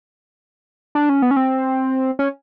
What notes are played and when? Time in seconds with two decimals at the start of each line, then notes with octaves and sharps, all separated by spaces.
0.95 D4
1.09 C#4
1.22 B3
1.31 C#4
1.36 C4
2.19 C#4